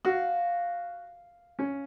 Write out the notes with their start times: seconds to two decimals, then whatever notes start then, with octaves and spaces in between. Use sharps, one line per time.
0.05 F#4 F5
1.59 C#4